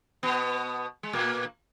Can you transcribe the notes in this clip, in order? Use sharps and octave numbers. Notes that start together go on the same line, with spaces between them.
B2 B3
G#3
A#2 A#3